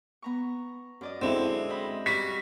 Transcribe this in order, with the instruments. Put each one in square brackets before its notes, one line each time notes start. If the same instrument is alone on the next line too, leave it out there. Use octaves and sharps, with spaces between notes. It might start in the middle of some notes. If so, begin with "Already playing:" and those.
[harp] B3 A#5 C#6
F#2 D5 D#5
[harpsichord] D3 G#3 [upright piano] C4 E4
[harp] C5 D#5 B5
[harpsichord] G3 F#4 [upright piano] B6